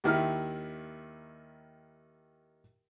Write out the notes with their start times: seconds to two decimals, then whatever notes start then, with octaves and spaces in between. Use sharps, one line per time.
0.04 D#2 D#3 E4 F6